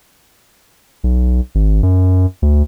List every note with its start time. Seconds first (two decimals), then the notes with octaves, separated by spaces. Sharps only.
1.04 B1
1.55 G#1
1.83 F#2
2.42 D2